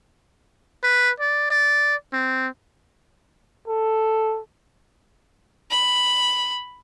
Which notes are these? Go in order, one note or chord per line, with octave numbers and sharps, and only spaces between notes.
B4
D5
D5
C4
A4
B5